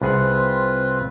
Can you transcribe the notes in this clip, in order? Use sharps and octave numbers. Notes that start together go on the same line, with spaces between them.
C2 C4 F4 G#4 B4 F#5